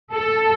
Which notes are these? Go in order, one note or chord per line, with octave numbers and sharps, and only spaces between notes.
A4